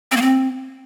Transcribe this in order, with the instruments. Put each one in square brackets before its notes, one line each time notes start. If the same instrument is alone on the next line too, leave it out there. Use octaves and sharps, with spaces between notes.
[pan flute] C4
A#3
C4